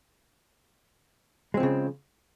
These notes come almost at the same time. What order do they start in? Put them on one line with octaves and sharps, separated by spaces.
G#3 C4 F3 C#3